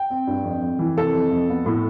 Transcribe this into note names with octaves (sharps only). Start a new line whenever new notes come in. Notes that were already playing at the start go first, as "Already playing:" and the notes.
Already playing: G5
C4
G2
F2
F2
E3
C3 A4
F2
F2
B3
A2